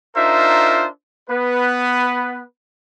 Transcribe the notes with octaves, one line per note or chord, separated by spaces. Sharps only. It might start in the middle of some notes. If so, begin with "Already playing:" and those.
D4 D#4 F4 A#4 C5 E5
B3 B4